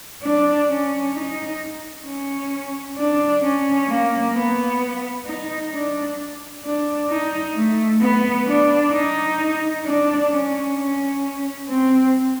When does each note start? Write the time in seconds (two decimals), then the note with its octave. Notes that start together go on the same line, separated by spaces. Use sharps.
0.22 D4
0.68 C#4
1.14 D#4
2.05 C#4
2.97 D4
3.43 C#4
3.89 A#3
4.35 B3
5.26 D#4
5.72 D4
6.64 D4
7.10 D#4
7.55 A3
8.01 B3
8.47 D4
8.93 D#4
9.84 D4
10.30 C#4
10.76 C#4
11.67 C4